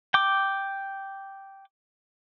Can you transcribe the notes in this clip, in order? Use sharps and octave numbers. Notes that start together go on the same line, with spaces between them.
G5 D6